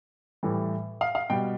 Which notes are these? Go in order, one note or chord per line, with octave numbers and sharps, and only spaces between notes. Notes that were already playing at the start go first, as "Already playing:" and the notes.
A2 E3 G3
F5
F5
B2 G3 G5